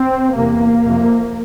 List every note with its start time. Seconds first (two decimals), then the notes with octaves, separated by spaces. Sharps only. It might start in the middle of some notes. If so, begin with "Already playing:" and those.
Already playing: C4
0.35 E2 C3 A#3
0.86 F2 C3